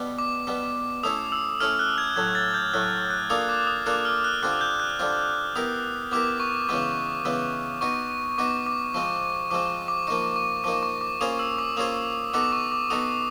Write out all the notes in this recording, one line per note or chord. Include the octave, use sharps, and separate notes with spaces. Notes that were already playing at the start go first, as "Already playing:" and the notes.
Already playing: B2 G3 B3
D6
B2 G3 B3
A3 C#4 E4 A4 D#6
E6
A3 C#4 E4 A4 F6
F#6
G#6
A2 F#3 A3 G#6
A6
G6
A2 F#3 A3 F#6
F#6
A#3 D4 F4 A4 D#6
D6
D#6
A#3 D4 F4 A4 F#6
F6
F#6
D3 G3 C4 F4 F#6
G6
F#6
D3 G3 C4 F4
B3 E4 G4 A#4 D#6
B3 E4 G4 A#4 D6
C#6
C#3 E3 G#3 B3 D6
C#3 E3 G#3 B3
B3 D#4 F#4 C#6
B3 D#4 F#4 D6
D6
F3 G#3 C4 C#6
F3 G#3 C4 D6
D6
F3 A#3 D#4 C#6
C#6
F3 A#3 D#4 D6
C#6
D6
A#3 C#4 F4 G#4 C5 D#6
E6
D6
A#3 C#4 F4 G#4 C5 D#6
B3 D#4 F#4 A4 D6
C#6
D6
B3 D#4 F#4 A4 D#6